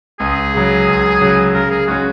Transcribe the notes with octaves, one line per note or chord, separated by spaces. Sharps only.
C#2 G#4
C#3 F#3
C#2
C#3 F#3
C#3 A#4
G#4
G#3 C#4 F#4